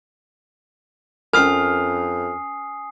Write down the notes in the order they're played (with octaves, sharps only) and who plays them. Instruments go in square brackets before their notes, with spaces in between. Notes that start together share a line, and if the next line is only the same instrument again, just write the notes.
[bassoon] F2 [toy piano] C#4 A#4 [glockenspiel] G#5 D#6 C7 [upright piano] F6